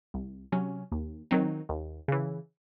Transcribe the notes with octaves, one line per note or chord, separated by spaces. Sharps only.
C2
C3 F#3 C#4
D#2
D#3 F#3 C4 D#4
D#2
C#3 E3